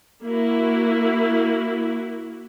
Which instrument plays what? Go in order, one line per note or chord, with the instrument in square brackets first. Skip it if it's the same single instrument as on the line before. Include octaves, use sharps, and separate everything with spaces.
[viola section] A#3 E4 F#4